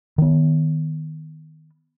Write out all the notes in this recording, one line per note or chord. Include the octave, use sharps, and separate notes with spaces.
D#3 B3